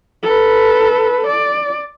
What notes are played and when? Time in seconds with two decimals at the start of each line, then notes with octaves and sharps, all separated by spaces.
0.23 A4 B4
1.27 D5